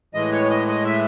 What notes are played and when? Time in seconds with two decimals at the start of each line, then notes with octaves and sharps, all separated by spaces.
0.14 A2 E3 G#3 D#5
0.32 C#5
0.50 D#5
0.67 D#5
0.85 E5